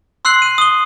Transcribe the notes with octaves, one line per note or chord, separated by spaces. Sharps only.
C6 E6 F#6 C7 F#7
D#7
D#6 G7